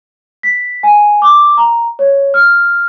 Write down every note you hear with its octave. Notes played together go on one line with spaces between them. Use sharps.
B6
G#5
D6
A#5
C#5
F6